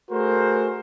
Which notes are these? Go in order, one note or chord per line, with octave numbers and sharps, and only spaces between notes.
A3 F#4 G#4 A#4 C5